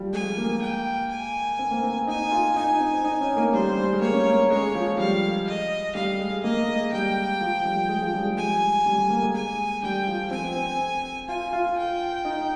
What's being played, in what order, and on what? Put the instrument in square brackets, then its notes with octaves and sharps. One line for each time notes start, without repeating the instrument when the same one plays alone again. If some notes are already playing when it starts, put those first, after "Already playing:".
Already playing: [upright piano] F3 G3
[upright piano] G#3 [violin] G#5
[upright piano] A#3
[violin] G5
G#5
[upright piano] C4
A#3
C4
[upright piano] D#4 [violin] G#5
[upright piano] F4
[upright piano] D#4 [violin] G#5
[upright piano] C4
D#4
C#4
A#3
[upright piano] G3 [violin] C5
[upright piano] G3
G#3
[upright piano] A#3 [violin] C#5
[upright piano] C#4
A#3
[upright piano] G#3 [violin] C#5
[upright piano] F3
[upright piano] G3 [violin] F5
[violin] D#5
[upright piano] G3 [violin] F5
[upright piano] G#3
[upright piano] A#3 [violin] D#5
[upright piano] G#3
[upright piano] G3 [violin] G5
[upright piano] F3
G3
G#3
F3
G3
G#3
[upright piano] G3 [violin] G#5
[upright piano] G3
G3
A#3
G#3
[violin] G#5
[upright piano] G3 [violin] G5
[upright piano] F3
[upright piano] C4 [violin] G#5
[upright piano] C4
[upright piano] F4 [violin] G#5
[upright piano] F4
[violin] G5
[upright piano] D#4